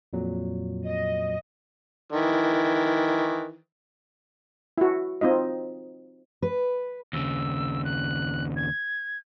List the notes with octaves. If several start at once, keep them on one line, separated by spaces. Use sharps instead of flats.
F2 A#2 F#3
D#5
D#3 E3
E4 F#4
C4 D#4 F4 D#5
B4
D#2 C#3 E6
F#6
G#6